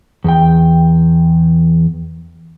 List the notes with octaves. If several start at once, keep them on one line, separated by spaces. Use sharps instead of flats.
E2 G5